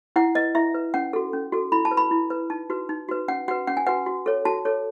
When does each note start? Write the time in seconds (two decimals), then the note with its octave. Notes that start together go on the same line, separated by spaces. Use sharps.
0.16 E4 F#5
0.35 B4 D#5
0.55 E4 E5
0.74 B4
0.94 C#4 F#5
1.13 F#4 A4
1.33 C#4
1.52 F#4 A4
1.72 E4 B5
1.85 A5
1.91 B4
1.97 B5
2.11 E4
2.30 B4
2.50 D#4 A5
2.70 F#4 B4
2.89 D#4
3.09 F#4 B4
3.28 C#4 F#5
3.48 F#4 B4 F#5
3.67 C#4 F#5
3.77 G#5
3.87 F#4 B4 F#5
4.06 F#4
4.26 A4 C#5
4.45 F#4 A5
4.65 A4 C#5